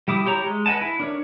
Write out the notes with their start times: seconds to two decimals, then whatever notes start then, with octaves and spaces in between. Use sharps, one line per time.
0.08 G3 E4 D6 D#6
0.26 E4 G4 C#5 A#5
0.44 G#3
0.66 B4 D#5 F#5 G#5 A5
0.81 E4
1.00 D4 A#4 C#5